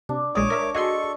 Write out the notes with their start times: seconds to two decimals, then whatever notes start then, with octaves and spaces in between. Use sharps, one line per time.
0.09 C3 D4
0.35 A#1 G#3 C#5 D5 D6 D#6
0.50 A#4 E5
0.74 F#4 G#4 A4 D#5 C6 C#6